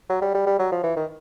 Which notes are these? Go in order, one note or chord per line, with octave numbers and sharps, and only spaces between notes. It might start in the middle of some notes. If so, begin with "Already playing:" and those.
F#3
G3
G3
G3
F#3
F3
E3
D#3